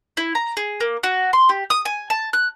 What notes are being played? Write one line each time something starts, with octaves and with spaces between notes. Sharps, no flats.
E4
A#5
G#4
A#3
F#4
C6
G4
D#6
G#5
A5
F#6